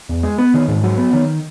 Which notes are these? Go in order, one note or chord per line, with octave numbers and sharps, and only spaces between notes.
E2
G#3
B3
D#3
G#2
F#3
B3
D#3